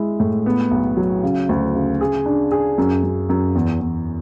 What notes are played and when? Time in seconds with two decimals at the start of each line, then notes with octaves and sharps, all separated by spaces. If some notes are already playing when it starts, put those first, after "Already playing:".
Already playing: G#3 E4
0.20 A2
0.46 B3
0.71 B1
0.97 F#3
1.24 C#3
1.49 D2
1.75 C#3
2.01 G#4
2.26 D4
2.52 G#4
2.78 F#2
3.03 F#2
3.29 F#2
3.55 E2
3.81 E2